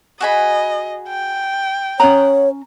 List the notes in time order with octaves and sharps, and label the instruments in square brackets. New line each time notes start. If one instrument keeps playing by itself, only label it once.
[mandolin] F#4 G#4 B5 [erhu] D#5
[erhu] G5
[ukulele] C#4 A#5 [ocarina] C#5 [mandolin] F#5 D#6